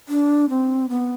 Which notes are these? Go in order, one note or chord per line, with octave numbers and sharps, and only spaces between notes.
D4
C4
B3